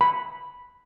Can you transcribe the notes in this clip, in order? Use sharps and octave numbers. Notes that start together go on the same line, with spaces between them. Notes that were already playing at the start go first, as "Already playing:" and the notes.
B5